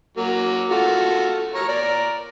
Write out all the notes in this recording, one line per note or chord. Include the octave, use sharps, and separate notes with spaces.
F#3 A#3
A3 F4 F#4
A#4 C#5
A#4 D5